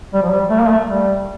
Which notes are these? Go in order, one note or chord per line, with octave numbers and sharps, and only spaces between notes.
G3
F3
G3
A3
A#3
A3
G3